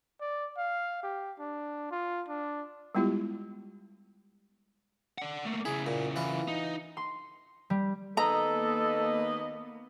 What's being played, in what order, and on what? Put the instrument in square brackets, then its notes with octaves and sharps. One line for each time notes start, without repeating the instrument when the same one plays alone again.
[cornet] D5
F5
G4
D4
F4
D4
[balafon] G3 G#3 B3 E4 F4 G4
[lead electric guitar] D5 F#5
A3 A#3
[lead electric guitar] C#3 E4 [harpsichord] G#4
[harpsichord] A#2
E3 F4 B4
[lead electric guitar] D#4
[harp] C6
G3
[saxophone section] D#2 B4 D#5 [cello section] A#3 B3 [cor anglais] A4 [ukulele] A#5